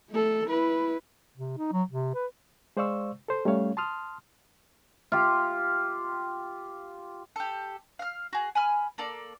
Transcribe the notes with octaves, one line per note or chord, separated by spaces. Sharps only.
A3 A4
E4 B4
C3
D#4
F#3
C3
B4
G#3 C5 D5 F5 C#6 E6
A4 C5
G3 A3 C#4 C#5 F5
A5 C6 D#6 F6
F4 G4
G4 A4
F5 F6
F#4 G#4
G#5 B5 F6
A#3 A4 D5